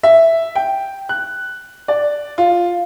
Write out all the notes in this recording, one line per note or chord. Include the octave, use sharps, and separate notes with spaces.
E5
G5
F#6
D5
F4